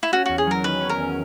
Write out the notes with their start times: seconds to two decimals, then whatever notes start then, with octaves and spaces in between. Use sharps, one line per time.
0.03 E4
0.12 C#4 F#4
0.26 E2 F#4
0.38 G#4
0.47 F#3 A#4
0.64 D#3 B4
0.81 C#4
0.89 A#4
0.98 E2